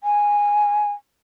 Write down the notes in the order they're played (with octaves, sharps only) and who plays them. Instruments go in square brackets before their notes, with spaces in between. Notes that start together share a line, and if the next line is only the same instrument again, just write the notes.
[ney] G#5